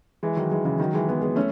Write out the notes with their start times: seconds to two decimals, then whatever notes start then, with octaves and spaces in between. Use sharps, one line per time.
0.23 E3 G#3
0.36 D#3 F#3
0.51 E3 G#3
0.65 C#3 E3
0.80 D#3 F#3
0.94 E3 G#3
1.09 G#3 B3
1.22 G#3 B3
1.36 A3 C#4